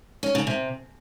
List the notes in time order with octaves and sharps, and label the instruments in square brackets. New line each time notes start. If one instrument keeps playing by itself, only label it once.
[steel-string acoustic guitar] C#4
C#3
C3